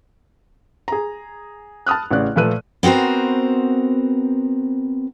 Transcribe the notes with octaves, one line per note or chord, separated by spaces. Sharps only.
G#4 A#5
A5 B5 D#6 F6 F#6
A1 C#3 D5 F#6
A#2 F3 A3 B4 F#6 D#7
B3 C4 F#4 A#4 C5